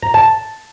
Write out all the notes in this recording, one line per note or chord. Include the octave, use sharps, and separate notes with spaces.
A#5
A5